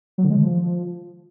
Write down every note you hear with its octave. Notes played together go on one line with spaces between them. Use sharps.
F#3
D3
G#3
D3
F3